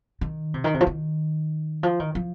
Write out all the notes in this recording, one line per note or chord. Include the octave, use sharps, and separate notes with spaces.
D#3
C3
D#3
C3
F3
D#3
F3
D#3
F3